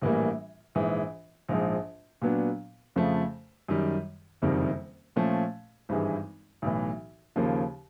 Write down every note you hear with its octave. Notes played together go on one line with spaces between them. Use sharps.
A#1 A2 E3 G3 A#3
A#1 G#2 E3
A#1 G#2 F3
A#2 F#3 B3 D4
F2 C#3 F3 A3
F#2 D#3 G3
F#1 F2 C3 D#3 G3
A#2 F3 A3 C#4
G#1 G2 E3 G#3
B1 A2 E3
D#2 C#3 F3 A#3